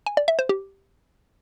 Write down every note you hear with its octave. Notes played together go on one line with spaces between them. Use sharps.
G#5
D5
E5
C5
G4